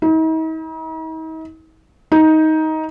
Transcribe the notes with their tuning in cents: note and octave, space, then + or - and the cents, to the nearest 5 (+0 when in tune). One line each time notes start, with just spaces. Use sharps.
D#4 +45
D#4 +15